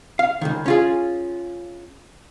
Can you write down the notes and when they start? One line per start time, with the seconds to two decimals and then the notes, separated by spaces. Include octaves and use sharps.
0.19 F5
0.41 C#2 F#2 D#3
0.66 C#4 F4 G#4